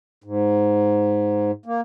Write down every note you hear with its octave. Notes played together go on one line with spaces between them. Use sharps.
G#2
A#3